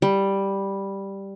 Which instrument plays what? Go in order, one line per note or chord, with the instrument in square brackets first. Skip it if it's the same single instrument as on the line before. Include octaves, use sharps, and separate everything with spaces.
[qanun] G3